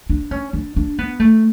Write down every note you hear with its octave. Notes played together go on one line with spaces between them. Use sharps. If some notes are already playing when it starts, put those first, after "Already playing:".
D4
C#4
D4
D4
B3
A3